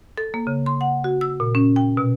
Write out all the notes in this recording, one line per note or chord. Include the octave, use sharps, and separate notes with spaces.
A4
A#3
C#3
C6
F#5
F#4
E6
A#2
C#4
G5
B2